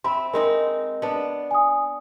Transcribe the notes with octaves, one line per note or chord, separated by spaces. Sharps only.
C4 E5 B5 C6
G#3 C4 D#4 A#4
B3 D4
G#5 D#6